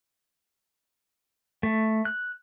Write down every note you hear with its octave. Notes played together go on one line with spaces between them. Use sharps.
A3
F#6